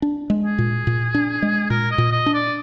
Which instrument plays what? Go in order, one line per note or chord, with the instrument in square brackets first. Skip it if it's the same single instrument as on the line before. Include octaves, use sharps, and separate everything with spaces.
[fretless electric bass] D4
G#3
[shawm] G#4
[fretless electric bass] A#2
A#2
D4
G#3
[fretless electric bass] A#2 [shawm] A#4
[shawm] D#5
[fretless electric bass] A#2
[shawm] D#5
[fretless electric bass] D4
[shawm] D5